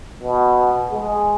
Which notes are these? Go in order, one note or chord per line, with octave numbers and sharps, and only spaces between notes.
B2
G#3